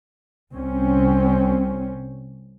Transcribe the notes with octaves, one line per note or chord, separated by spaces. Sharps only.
C2 C4 C#4